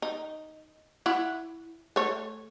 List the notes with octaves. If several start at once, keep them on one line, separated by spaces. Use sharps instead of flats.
D#4
E4 E5 F#5
A3 C#5